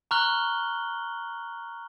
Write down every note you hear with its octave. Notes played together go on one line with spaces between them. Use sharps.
A#5 C#6 F6 F#6 F#7 G7